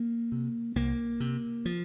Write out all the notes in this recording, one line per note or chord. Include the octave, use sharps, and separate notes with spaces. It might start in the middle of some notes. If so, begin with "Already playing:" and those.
Already playing: A#3
C3
C2 A#3
C3
F3